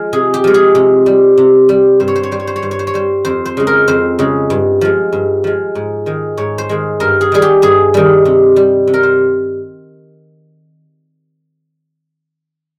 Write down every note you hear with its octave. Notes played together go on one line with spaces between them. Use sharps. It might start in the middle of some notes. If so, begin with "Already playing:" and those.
Already playing: F3 G#3
C3 G#4
G4
F3 G#3
G#4
C3
G3
C3
G3
G2 C5
C#5
C5
C#5
G3 C5
C#5
C5
C#5
G2 C5
C#5
C5
C#5
G3 C5
F2 C5
C5
C#3 G#3
A#4
F2 C5
C#3 G#3
G2
F3 G#3
G2
F3 G#3
G#2
D#3 G#3
G#2 C#5
C5
D#3 G#3
G2 A#4
G#4
D#3 G3 G#4
G4
G2 G#4
D#3 G3
C3
G3
C3
A#4
C5